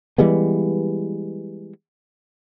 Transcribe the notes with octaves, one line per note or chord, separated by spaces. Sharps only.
E3 G3 G#3 B3